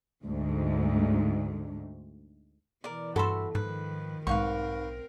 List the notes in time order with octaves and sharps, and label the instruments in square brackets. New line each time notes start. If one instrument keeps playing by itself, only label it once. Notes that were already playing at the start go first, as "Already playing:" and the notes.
[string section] D2 G#2
[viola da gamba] B2 E3 [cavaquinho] A#4 D5
[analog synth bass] G2 [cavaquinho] F#4 B5 C6 [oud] A4 E5
[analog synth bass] G#2 [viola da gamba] D#3 F3 [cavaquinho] B4
[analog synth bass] B1 [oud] G#2 [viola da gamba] C4 A#4 [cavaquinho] B4 F5 C#6